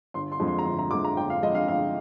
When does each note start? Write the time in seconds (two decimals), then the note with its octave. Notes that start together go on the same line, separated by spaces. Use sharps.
0.14 G1 C6
0.32 C6
0.40 F2 D3 G#3
0.48 C6
0.59 A#5
0.65 G1 C6
0.79 A#5
0.91 F2 D3 G#3 D6
1.04 A#5
1.17 G1 G5
1.30 F5
1.42 F2 D3 G#3 D#5
1.55 F5
1.68 G1 F5